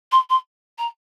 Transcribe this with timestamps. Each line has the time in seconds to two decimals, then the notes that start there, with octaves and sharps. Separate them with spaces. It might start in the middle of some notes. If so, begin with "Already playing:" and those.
0.12 C6
0.30 C6
0.78 A#5